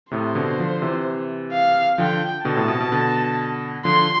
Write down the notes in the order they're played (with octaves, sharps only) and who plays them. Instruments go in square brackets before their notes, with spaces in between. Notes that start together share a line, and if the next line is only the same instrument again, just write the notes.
[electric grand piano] A2 C3 [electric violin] C5
[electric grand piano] B2 D3
D3 F3
C3 E3
[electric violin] F5
[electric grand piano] D3 F3 [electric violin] G5
[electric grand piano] B2 D3 [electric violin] A5
[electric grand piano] A2 C3
B2
B2
B2 D3
[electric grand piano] D3 F3 [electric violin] C6